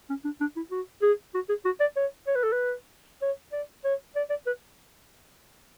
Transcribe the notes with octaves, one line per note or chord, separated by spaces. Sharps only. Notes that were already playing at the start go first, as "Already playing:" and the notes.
C#4
D4
D4
E4
F#4
G#4
F#4
G#4
F#4
D5
C#5
C#5
B4
A4
B4
C#5
D5
C#5
D5
D5
B4